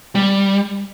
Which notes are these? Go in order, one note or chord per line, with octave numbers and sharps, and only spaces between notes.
G3